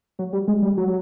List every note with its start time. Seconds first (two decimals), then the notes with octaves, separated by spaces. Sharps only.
0.19 F#3
0.33 G3
0.48 G#3
0.63 G3
0.77 F#3